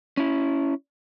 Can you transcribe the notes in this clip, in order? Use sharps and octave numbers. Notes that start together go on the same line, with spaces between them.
C#4 E4